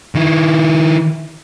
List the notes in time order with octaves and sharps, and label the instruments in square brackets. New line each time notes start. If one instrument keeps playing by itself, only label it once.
[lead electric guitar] D#3 E4